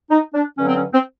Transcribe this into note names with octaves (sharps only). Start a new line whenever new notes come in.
D#4
D4
G2 D3 F#3 C#4
C4
C#4
C4